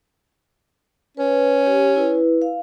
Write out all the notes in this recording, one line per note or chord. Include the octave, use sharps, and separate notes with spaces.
C#4 B4
G4
E4 B4
F5